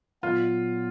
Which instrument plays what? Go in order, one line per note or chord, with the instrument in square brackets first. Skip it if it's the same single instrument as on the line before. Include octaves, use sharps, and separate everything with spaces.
[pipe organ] A#2 F#3 B3 [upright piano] F4